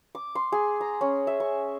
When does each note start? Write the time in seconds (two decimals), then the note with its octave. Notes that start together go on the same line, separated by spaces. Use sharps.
0.15 D6
0.35 C6
0.52 G#4
0.81 A#5
1.01 C#4
1.27 E5
1.40 C#6